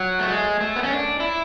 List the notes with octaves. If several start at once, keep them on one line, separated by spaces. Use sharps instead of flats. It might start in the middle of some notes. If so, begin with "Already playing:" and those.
Already playing: F#3
A3
G#3
A3
B3
C#4
D4
E4